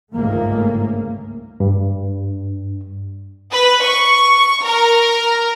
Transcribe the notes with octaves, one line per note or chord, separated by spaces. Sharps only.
G1 C#2 G#2 D#3 A3 A#3
G2
B4
C#6
A#4